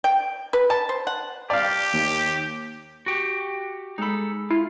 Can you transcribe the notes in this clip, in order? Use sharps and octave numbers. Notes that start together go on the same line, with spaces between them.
G5
B4
A5
C5
F#5
G4 D5 F5
D#2
F#4 G4
G#3 D#4 A4 B5
E4 F4